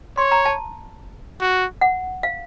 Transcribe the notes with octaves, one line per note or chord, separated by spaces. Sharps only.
C#5 C6
A#5
A5
F#4
F#5
F5